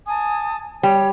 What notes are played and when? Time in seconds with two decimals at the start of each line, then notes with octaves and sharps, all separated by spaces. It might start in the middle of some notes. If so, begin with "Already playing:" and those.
0.07 G#5 A5 D#6
0.83 G3 C#5